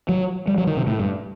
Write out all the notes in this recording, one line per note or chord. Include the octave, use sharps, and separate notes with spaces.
F#3
G3
F#3
D#3
C3
A2
G2